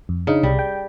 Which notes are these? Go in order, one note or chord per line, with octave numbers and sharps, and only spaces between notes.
F2
C#3 D4 D#4
C2 G3
G5